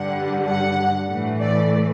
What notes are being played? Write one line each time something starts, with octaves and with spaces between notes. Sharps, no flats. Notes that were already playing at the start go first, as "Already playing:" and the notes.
Already playing: G2 D3 G3 F#5
F#5
A2 E3 A3
D5